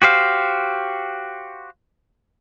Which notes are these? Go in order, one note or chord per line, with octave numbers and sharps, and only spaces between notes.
F#4 G4 C5 F5